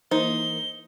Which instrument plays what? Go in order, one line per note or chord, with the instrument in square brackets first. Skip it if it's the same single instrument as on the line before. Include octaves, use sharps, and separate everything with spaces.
[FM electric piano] E3 A#3 [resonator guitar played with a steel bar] D#4 [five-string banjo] C5 [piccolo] G7